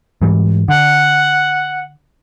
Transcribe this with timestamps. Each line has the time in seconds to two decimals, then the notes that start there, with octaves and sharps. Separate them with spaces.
0.22 G#2 E3 G3
0.68 D3 F#5